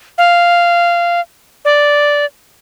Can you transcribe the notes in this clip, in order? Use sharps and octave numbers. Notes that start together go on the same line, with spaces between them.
F5
D5